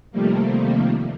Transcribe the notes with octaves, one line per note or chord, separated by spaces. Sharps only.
C3 D#3 F3 G3 A3 A#3